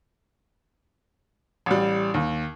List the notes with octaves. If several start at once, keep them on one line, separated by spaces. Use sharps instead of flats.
A1 G3
D#2